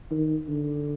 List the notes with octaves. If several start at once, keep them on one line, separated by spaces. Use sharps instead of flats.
D#3
D3